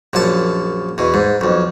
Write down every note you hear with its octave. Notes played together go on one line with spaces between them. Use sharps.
A#1 F#2 A#2 A5
E2 B2
G#2
B1 F2